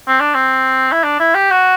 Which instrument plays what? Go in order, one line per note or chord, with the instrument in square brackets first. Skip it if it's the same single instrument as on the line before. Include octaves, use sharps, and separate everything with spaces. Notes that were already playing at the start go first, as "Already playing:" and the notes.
[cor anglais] C4
D4
C4
E4
D4
E4
G4
F#4